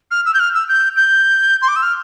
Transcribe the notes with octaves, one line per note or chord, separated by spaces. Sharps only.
F6
E6
G6
F6
E6
G6
G6
C6
D6
E6
F6